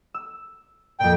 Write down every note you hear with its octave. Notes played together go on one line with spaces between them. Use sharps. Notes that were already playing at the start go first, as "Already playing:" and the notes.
E6
F2 A#2 G5